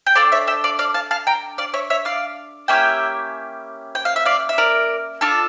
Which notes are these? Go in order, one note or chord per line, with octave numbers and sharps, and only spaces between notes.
G5
D4 A4 D5 F5
C#5 E5
E5 G5
D5 F5
D5 F5
F5 A5
F5 A5
G5 A#5
D5 F5
C#5 E5
C#5 E5
D5 F5
A#3 C#4 E4 G4 E5 G5
G5
F5
E5
D5 F5
E5
A#4 D5
D4 F4 A4